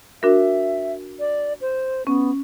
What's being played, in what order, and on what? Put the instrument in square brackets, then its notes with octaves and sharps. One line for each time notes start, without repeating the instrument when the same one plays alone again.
[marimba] D4 F#4 A#4 [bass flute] E5
[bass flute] D5
C5
[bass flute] B3 [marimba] C#4